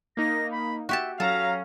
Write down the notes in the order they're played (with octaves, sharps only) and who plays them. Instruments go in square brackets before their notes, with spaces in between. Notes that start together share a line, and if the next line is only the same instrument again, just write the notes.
[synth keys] A#3 D#4 [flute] A#6
[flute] B5
[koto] F#4 G4 A5 [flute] E5
[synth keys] F#3 A#5 A#6 [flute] C#4 [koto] A4 [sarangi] F5